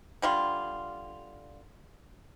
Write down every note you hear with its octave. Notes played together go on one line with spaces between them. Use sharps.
D3 G3 F4